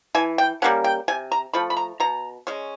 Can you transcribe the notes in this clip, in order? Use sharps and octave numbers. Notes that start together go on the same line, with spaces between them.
E3 G#5
G5
G3 A#3 C#4 F#5
G5
C3 G#5
A#5
F3 A3 B5
B5
A#5
B2 A#5
G#3 C#4